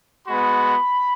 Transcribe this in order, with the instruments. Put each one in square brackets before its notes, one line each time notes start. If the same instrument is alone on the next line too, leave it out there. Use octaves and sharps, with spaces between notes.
[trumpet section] G#3 B3 F#4 B5